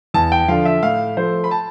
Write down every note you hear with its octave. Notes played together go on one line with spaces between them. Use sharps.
E2 A5
G5
D3 F3 F5
E5
A2 F5
F3 A3 C5
B5
A5